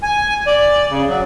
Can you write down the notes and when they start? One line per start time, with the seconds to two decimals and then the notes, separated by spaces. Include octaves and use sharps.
0.03 G#5
0.47 D5
0.90 C#3
1.09 F#3